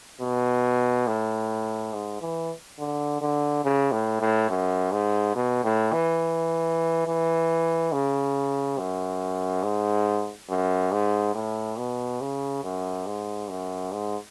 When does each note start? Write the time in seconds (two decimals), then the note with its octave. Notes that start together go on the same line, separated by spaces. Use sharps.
0.21 B2
1.07 A2
1.93 G#2
2.21 E3
2.79 D3
3.21 D3
3.64 C#3
3.92 A2
4.21 A2
4.50 F#2
4.92 G#2
5.35 B2
5.64 A2
5.92 E3
7.07 E3
7.92 C#3
8.78 F#2
9.63 G#2
10.49 F#2
10.92 G#2
11.35 A2
11.78 B2
12.21 C#3
12.64 F#2
13.06 G#2
13.50 F#2
13.92 G#2